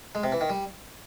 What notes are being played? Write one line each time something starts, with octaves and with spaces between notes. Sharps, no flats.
G#3
C3
E3
D#3
G3